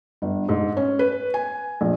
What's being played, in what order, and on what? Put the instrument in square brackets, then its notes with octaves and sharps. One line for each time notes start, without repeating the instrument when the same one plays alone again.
[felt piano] G1
G#2
C#4
B4
G#5
A#1